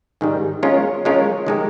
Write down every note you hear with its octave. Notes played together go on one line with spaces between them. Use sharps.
G#2 D#3 G3
G#3 C#4 F4 A#4 C#5
G#3 C#4 F4 A#4 C#5
D#3 G#3 D#4 G4 A#4